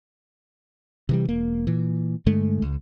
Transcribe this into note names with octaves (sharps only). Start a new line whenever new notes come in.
C3 E3 G3
E1 A#3
A#2 E3
G2 D3 G#3 A3
C#2